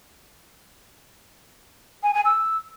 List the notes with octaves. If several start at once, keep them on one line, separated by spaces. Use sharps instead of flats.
G#5
G#5
E6